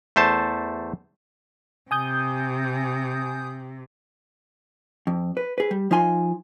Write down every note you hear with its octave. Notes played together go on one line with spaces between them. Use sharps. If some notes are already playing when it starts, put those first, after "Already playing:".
E2 A3 C5 A5
C3 G#5 D#6 G6
F2
B4
G#4 B4
G3
F3 D#4 F4 G#5 B5 C6